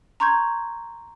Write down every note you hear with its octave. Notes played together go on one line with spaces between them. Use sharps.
A#5 C6 C#6 G6 G#6